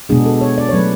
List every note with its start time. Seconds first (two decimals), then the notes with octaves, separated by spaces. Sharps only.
0.09 B2 G#3 B3 D4 G#4
0.26 A4
0.41 C#5
0.58 D5
0.69 C#5
0.73 F#3 A3 C#4 B4